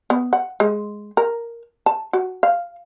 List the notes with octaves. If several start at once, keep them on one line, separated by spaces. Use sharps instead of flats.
B3
F#5
G#3
A#4
A5
F#4
F5